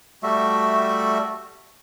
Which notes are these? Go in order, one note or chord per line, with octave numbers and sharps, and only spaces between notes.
G3 A3 F#4 E5